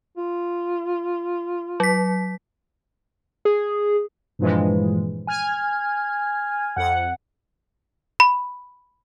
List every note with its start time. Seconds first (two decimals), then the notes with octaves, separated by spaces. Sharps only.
0.17 F4
1.80 F#3 B6
3.45 G#4
4.39 G2 A#2 E3 F3 G#3
5.27 G#5 F6 G#6
6.76 F2 F#5
8.20 B5